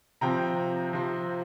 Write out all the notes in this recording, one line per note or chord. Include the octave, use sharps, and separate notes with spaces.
C3 F3 C4 G5 A#5
C3 F3 C4